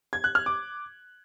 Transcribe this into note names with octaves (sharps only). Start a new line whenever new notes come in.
G#6
F#6
F6
D6